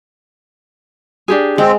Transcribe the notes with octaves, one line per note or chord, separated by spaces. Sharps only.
D4 G4 G#4
G#3 C4